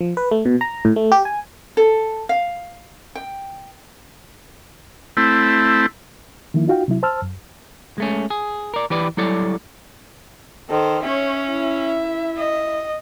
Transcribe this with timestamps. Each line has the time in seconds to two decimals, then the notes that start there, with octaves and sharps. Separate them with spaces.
0.01 F3
0.17 B4
0.31 A3
0.45 B2
0.61 A#5
0.85 A2
0.96 A3
1.12 G4
1.25 G#5
1.77 A4
2.29 F5
3.15 G5
5.17 A3 C4 E4
6.54 D#3 F3 A#3 E4
6.68 D#4 F4 F#4 F5 G5
6.88 C3 F#3 E4
7.03 C5 A5 E6 F6
7.22 F#2
7.98 G#3 A3 C#4
8.30 G#4
8.74 A#4 D5
8.90 E3 G4 B4 D5
9.17 F#3 G3 E4 A4 C#5 D5
10.69 D#3 A4 C5
11.03 C#4 C#5 E5
11.50 E4 E5
12.38 D#5